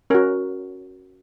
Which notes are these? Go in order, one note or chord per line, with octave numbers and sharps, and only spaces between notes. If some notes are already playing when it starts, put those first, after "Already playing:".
C#4 F#4 A#4